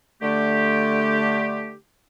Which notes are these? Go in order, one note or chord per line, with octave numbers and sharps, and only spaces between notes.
D3 A3 G4